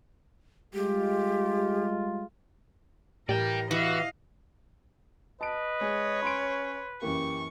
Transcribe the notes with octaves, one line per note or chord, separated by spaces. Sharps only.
G3 G#3 F4 G4
A2 E3 G4 A#4 D5 G5
E3 F#4 D#5 F5
B4 D#5 A5 D7
G#3 C#5
C#4 B5 C6 D7
F#2 E3 A#3 G4 C#6